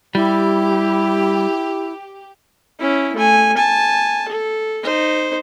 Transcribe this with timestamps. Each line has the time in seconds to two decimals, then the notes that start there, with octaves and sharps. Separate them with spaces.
0.15 G3 E4 G4
2.79 C#4 E4
3.16 A3 G#5
3.57 G#5 A5
4.28 A4
4.83 D#4 C5